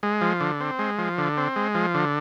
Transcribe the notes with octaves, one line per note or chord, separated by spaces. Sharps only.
G#3
F3
D3
C4
G#3
F3
D3
C4
G#3
F3
D3